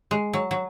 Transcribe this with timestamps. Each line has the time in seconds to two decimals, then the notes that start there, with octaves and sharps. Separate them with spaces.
0.11 G#3
0.33 F#3
0.51 F#3